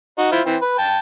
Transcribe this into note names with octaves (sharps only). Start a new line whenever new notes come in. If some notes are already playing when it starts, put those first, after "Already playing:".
D#4 F#4
E4 F4 C5
E3 C4
B4
G5 A5